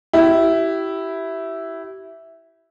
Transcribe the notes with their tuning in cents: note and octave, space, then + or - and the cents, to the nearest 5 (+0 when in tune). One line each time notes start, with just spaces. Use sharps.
E4 +0 G4 -30